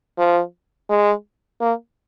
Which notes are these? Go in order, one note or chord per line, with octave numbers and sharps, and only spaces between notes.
F3
G#3
A#3